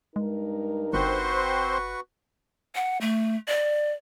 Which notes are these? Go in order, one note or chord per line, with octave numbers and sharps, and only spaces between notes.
G2 G#3 D#4 A#4
G1 C4 F#4 B4 C5 C6 C#6
F#5
A3
D5